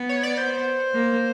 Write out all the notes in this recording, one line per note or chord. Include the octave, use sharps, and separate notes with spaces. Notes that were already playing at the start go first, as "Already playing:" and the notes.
Already playing: B3
C#5
D5
C5
A#3